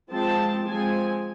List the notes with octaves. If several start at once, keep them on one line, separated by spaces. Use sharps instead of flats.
F3 G#3 C4 A5
F3 G#3 C4 G#5